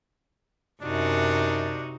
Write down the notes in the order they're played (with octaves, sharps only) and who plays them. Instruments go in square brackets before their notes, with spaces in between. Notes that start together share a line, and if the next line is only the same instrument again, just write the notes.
[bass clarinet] F#2 [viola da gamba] C3 D#4 F#4 [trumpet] D4